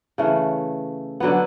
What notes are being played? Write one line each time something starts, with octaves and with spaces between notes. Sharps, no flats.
C#3 E3 A3
D3 F#3 B3